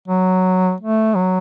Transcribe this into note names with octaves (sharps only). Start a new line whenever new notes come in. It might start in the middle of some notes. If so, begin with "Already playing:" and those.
F#3
A3
F#3